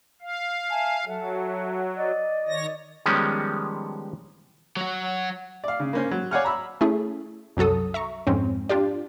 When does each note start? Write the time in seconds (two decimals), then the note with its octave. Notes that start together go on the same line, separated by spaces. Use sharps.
0.21 F5
0.70 E5 G#5 A5
1.06 F#3 A4 E5 F#5
1.95 D5 D#5
2.48 D#3 C#5 A#6
3.06 D#3 F3 G3 G#3 B3 C#4
4.77 F#3 F#4
5.64 D5 F5
5.80 C#3
5.93 A#3 C#4 C5
6.11 F#3
6.31 C#5 D5 F5 F#5 G#5 F6
6.45 A#5 B5 E6
6.81 A3 C#4 E4 G#4
7.57 C2 F#2 F#3 A4 D#6
7.94 E5 A#5 C#6
8.27 F2 G#2 C4 C#4
8.69 D4 F4 G4 D5